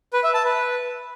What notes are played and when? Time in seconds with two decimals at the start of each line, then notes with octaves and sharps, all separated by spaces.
0.13 B4
0.24 E5
0.34 A5
0.44 B4